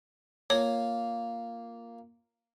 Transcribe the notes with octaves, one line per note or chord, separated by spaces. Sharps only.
A#3 F4 C#5